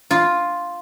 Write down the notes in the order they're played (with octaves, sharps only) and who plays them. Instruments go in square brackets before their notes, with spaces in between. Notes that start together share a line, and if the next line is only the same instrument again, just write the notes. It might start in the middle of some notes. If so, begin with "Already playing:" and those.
[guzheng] F4